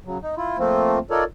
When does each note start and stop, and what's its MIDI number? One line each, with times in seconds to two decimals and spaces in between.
0.05 0.18 49
0.05 0.18 54
0.22 0.35 63
0.37 0.58 64
0.37 0.58 65
0.58 0.99 53
0.58 0.99 57
0.58 0.99 58
0.58 0.99 60
0.58 0.99 65
1.10 1.24 63
1.10 1.24 65
1.10 1.24 69
1.10 1.24 70
1.10 1.24 73
1.10 1.24 74